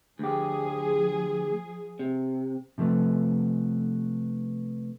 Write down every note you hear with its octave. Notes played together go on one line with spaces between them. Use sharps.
D2 F3 G4 G#4
C3
C3 F3 A3 B3